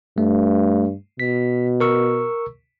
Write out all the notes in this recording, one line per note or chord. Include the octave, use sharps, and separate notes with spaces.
G2 A3
B2 B6
A#4 C#6 E6